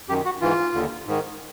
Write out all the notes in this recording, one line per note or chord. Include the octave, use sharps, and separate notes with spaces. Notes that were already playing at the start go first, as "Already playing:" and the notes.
F#2 D#3 G4
F#4
G#2 E3 F4
D#2 D3
G#2 D#3